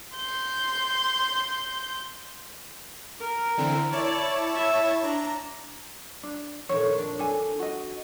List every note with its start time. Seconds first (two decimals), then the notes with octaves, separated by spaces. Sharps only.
0.15 C6 G6
3.20 A#4
3.57 D3 E3 C4
3.93 E4 C#5 D5 A5
4.55 E5
5.03 D4 A#5
6.23 D4
6.69 F2 A#2 D#3 C#5
6.98 D4
7.19 D4 A4 G#5
7.59 F#4 D#5